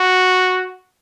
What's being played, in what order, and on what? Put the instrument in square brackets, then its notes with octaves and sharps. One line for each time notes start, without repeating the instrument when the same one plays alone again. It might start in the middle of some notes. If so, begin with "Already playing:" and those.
Already playing: [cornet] F#4